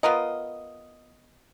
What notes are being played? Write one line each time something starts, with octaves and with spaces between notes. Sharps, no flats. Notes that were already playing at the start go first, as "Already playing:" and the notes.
B3 F4 A#4 D#5